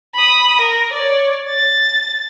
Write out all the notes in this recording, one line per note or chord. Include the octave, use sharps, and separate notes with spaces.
B5 D#6
A#4
C#5 D5
A6